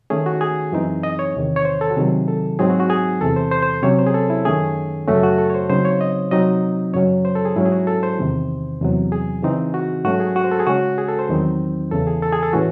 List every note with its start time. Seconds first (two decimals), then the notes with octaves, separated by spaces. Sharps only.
0.10 D#3 A3 C#4 G#4
0.26 F#4
0.41 G#4
0.72 F#2 E3 C4 D#4
1.03 D#5
1.19 C#5
1.34 E2 C3 D#3
1.56 C#5
1.65 C5
1.81 A4
1.90 F#4
1.96 C3 D#3 F#3 G#4
2.28 A4
2.59 G#2 F#3 C4 D#4 G#4
2.70 F#4
2.80 F#4
2.90 G#4
3.21 E2 C3 E3 A4
3.36 C5
3.51 C5
3.62 C5
3.83 C3 F#3 C#4 C#5
3.99 C5
4.07 G#4
4.14 A4
4.30 E4
4.45 F#2 D#3 A3 C#4 G#4
5.08 F#2 C#3 F#3 A3 C#4 F#4
5.23 F#4
5.38 A4
5.50 C#5
5.54 C5
5.69 C#3 F#3 C4 D#4 C5
5.85 C#5
6.01 D#5
6.31 C3 F#3 C4 D#4 D#5
6.94 F#2 C#3 F#3 C#4 C#5
7.25 C5
7.35 A4
7.45 G#4
7.56 G#2 F#3 C#4 E4
7.65 G#4
7.72 F#4
7.87 A4
8.03 C5
8.18 E2 C3 D#3
8.81 E2 C3 F#3
9.12 G#4
9.42 C#3 E3 C4 D#4
9.74 F#4
10.04 G#2 F#3 A3 C#4 F#4
10.20 G#4
10.36 F#4
10.44 C5
10.51 A4
10.60 G#4
10.67 C#3 G#3 C#4 F#4
10.98 G#4
11.08 A4
11.19 C5
11.29 E2 D#3 F#3 C4 D#4
11.91 E2 C#3 E3 A4
12.07 G#4
12.22 A4
12.33 G#4
12.43 A4
12.53 A2 E3 A3 C#4 F#4